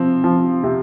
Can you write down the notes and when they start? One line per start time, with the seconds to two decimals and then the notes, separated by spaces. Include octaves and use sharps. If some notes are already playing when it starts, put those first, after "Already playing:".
Already playing: C3 F3 C4
0.24 F3
0.64 C3